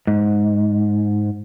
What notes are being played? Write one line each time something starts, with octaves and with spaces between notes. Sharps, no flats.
G#2